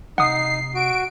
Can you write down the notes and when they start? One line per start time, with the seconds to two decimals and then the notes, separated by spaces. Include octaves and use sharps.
0.18 C3 D#4 F#5 D#6 C7
0.75 F#4 D7